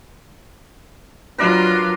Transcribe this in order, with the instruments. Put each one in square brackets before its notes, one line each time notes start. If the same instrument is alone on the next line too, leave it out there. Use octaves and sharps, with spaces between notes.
[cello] F#3 F4 [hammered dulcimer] D4 A#4 B4